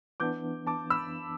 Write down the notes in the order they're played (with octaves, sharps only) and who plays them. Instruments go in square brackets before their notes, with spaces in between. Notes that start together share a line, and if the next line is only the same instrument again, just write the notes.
[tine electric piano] E3 B3 D4 [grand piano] D6 G6
[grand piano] A5 D6
B5 E6